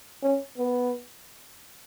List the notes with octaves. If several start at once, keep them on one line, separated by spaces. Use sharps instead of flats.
C#4
B3